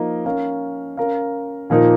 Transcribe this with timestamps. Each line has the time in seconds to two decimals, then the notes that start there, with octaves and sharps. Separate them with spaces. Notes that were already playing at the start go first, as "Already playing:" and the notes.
Already playing: F3 A#3 D#4 A#4 D#5
0.25 C#4 A#4 F5
0.97 C#4 A#4 F5
1.70 A#2 F3 A#3 D#4 A#4